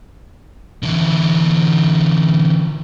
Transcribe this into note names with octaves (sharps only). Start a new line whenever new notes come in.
D3 E3